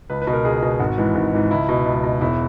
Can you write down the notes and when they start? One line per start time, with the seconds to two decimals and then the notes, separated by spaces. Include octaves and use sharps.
0.10 C#2 B4
0.22 B4
0.27 B2
0.33 A#4
0.45 C#2 G#4
0.63 B2
0.79 G#1 F#4
0.98 G#2 E3
1.15 G#1
1.33 G#2 E3
1.51 C#2 E4
1.69 B2
1.86 C#2
2.03 B2
2.21 E1 E4